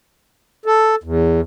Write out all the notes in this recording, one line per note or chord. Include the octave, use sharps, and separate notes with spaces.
A4
E2